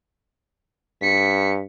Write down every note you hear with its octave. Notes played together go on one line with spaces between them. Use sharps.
G2 B6 C#7